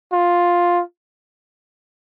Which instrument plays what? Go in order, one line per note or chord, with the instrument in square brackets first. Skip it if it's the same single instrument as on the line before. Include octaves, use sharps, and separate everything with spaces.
[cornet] F4